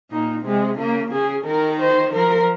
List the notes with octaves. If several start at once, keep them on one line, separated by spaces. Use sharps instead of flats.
A#2 D#4
C3 G#3
C#3 A#3
C#3 G#4
D#3 A#4
C5
F3 A#4